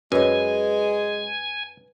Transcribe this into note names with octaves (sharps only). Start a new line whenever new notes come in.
F#2 G#3 B4 C#5 D#5 G#5